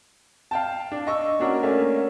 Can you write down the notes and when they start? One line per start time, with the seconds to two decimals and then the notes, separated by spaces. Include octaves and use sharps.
0.51 F5 G5 A5
0.92 D4
1.07 D#5 C#6 E6
1.39 A#3 C#4 D4 F#4 A#4
1.63 A3 A#3 C#4 D5 E5